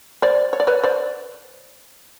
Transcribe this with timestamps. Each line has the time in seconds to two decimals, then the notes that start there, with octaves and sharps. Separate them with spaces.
0.22 C5 D5
0.53 C#5
0.60 D5
0.67 B4 C#5
0.84 C5 D5